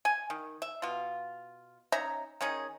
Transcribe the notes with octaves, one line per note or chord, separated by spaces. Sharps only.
G#5
D#3
E5
B2 F4
C#4 D#4 E5 A#5
D#3 C#4 D#4 G#4